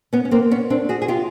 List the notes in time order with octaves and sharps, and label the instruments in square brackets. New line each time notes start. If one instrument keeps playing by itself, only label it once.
[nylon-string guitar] B3 C#4
C#4
A#3 C4
B3 C#4
C4 D4
F#4 G#4
G#4
F4 G4